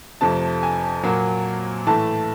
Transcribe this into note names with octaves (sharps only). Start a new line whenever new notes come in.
F2 C3 F3 A3 A5
G#5
A#2 F#3 A#3
A2 E3 A3 A5